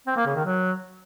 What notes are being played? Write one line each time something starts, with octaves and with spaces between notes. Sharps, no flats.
C4
A#3
C#3
D#3
F#3